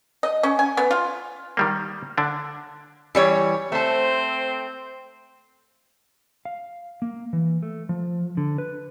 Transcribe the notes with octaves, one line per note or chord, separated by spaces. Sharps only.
D#5
C#4
G#5
B3
F4
D#3 G3 A#3
D3 D4
E3 G3 C#5
A3 C4 C5 A5
F5
A#3
E3
A3
F3
D3
B4